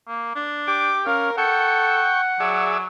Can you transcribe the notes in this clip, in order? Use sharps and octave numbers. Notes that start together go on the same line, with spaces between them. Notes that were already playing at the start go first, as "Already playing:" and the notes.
A#3
D4
G4 D6
C#4 A#4 F5
A4 F#5 G5 C#6
F#3 G#4 D5 E5